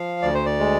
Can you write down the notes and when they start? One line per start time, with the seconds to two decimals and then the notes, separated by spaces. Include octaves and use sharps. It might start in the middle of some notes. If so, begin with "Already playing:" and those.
Already playing: F3 F5
0.22 D2 D5
0.34 C5
0.46 D5
0.59 G#3